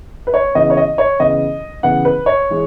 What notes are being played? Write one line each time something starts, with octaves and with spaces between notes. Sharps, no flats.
B4
C#5
C#3 E3 B3 D#5
C#5
D#5
C#5
C#3 E3 B3 D#5
C#3 E3 B3 F#5
B4
C#5
E3 G#3